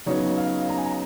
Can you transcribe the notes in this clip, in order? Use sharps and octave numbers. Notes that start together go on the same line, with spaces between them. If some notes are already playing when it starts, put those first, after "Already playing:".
C#3 F#3 B3 D#4 C#5
F5
A#5
G#5
A#5